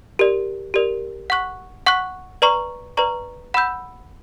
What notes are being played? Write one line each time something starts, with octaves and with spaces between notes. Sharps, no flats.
G4 A#4 D5
G4 A#4 D5
F#5 C#6 F#6
F#5 C#6 F#6
B4 D5 A#5 C#6
B4 D5 A#5 C#6
F#5 B5 E6 G6